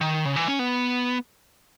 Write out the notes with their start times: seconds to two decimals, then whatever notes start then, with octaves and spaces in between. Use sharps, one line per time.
0.01 D#3
0.25 C#3
0.36 E3
0.48 C#4
0.59 B3